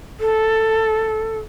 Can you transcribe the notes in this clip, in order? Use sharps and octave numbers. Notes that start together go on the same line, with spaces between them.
A4